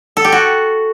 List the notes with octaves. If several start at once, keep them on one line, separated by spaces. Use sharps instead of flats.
A4
G4
F#4